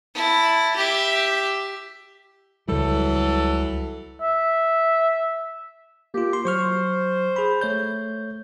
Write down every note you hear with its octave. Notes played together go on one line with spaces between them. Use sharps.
E4 A5
G4 E5
C#2 E3 F#3 G3 A4
E5
A#3 F4 G4
C6
F#3 C5 C#6 F6
G#4 B5
A3 C#5 G6